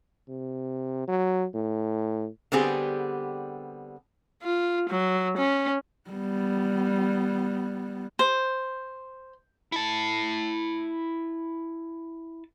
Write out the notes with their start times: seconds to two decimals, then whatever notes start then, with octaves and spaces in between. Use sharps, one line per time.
0.29 C3
1.08 F#3
1.55 A2
2.52 D3 G3 B3 C4 G4 G#4
4.43 F4
4.89 F#3
5.38 C#4
6.10 G3 B3
8.19 C5
9.72 E4 A5